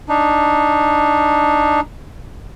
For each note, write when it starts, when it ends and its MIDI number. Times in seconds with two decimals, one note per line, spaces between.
0.09 1.80 62
0.09 1.80 63